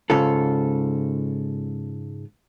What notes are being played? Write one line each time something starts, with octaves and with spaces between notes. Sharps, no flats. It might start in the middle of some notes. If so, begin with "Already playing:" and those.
G#2 C#3 F4 A4